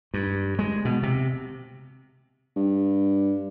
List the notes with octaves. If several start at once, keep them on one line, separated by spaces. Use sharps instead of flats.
G2
G#3
B2
C3
G2